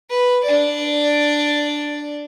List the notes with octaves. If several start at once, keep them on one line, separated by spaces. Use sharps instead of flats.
B4
D4 D5